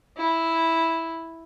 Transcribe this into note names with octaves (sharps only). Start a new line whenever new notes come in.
E4